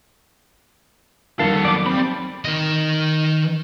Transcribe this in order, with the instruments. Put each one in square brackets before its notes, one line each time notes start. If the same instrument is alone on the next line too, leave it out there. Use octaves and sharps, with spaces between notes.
[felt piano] F2 D#3 A#3 [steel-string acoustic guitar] G3 [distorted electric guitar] B3 A4 [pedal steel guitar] F5
[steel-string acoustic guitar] F#3 [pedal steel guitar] D5 D6
[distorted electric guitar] G3 B5 [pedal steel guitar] C4
[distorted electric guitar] D#3 D#5